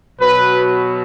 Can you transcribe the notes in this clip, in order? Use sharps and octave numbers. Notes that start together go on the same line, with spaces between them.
B2 F#3 B4